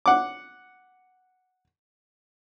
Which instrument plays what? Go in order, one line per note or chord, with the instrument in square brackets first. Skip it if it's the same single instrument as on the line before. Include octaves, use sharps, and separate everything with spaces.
[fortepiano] F#5 D6